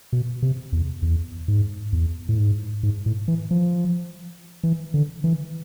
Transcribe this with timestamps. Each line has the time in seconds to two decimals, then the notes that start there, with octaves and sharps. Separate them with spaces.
0.13 B2
0.42 C3
0.72 E2
1.02 E2
1.48 G#2
1.93 E2
2.29 A2
2.38 G#2
2.83 G#2
3.06 A2
3.28 E3
3.51 F3
4.63 E3
4.94 D3
5.24 E3